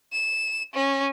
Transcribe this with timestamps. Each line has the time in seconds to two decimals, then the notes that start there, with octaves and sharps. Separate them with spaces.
0.13 E7
0.74 C#4